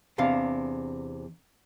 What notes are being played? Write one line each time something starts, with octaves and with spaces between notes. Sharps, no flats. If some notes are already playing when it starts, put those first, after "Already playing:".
E2 C3 D4 F5